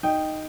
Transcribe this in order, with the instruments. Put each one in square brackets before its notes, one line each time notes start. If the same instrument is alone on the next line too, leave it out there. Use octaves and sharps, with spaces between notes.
[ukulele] D#4 [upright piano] G5